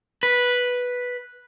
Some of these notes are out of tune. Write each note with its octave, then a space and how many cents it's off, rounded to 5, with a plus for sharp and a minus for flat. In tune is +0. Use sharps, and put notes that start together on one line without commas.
B4 -5